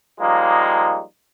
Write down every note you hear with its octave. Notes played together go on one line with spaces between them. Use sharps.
F3 G3 G#3 A#3 D#4